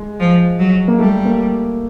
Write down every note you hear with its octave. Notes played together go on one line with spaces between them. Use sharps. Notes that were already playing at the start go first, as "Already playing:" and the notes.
Already playing: G#3
F3
F#3
A#3
G3 A3
A#3